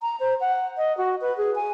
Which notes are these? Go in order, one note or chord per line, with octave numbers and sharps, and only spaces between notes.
A#5
C5
F#5
D#5
F#4
B4
G#4
G#5